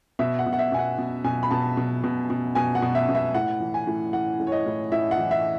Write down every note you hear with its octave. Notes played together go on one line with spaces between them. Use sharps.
B2 E5
F#5
B2
F#5
E5
B2 G#5
F#5
B2
B2 G#5
B5
B2 A5
B2
B2
B2
B2 G#5
F#5
B2
E5
B2
E5
A2 F#5
E3
G#5
A2
E3 F#5
A2
C#5
D#5
A2
A2 E5
F#5
E3
E5